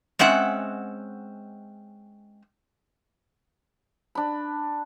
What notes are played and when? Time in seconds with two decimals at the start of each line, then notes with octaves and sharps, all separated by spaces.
0.19 G#3 C4 C#4 E5 F#5
4.15 D4 B5